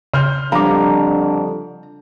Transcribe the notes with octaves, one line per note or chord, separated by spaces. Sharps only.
C#3 C6 F6 G6
F2 D3 F3 G3 D4 F5 A#5 D6